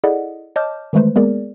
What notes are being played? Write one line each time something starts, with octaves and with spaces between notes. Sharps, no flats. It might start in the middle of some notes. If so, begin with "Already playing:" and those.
E4 G#4 A4 D5 D#5 F#5
C#5 D#5 A5 D6 F6 G6
D#3 E3 G#3 A3 B4 C5
G#3 A#3 B3 G#4 A#4 D5